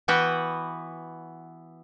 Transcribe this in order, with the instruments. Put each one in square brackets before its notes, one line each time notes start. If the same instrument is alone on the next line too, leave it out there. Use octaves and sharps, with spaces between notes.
[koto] E3 B3 F#4 B4 F#5 G5